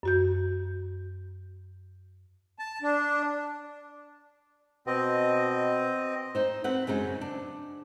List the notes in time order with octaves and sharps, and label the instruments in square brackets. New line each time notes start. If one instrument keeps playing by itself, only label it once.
[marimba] F#2 F#4 G6
[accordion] A5
D4
[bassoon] B2 [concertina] C4 D#5
[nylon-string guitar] D#4 C5
C4 B4 F#5
F#2 C#3 G#3 D#4
D4